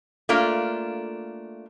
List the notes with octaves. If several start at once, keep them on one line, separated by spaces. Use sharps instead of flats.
A3 A#3 D4 F4 F5